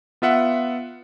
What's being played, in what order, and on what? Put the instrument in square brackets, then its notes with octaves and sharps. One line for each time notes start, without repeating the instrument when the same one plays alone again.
[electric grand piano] B3 F4 E5 F#5